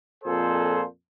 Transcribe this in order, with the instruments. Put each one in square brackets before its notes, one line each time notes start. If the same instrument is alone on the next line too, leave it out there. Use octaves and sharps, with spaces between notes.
[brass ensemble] F2 A#2 G#4 A4 C5